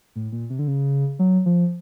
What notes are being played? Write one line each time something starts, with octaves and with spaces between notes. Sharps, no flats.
A2
A#2
C3
D3
C#3
F#3
F3